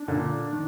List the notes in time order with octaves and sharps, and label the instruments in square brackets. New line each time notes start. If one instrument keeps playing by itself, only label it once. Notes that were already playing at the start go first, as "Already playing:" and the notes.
Already playing: [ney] D4
[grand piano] A#2 D3
D#3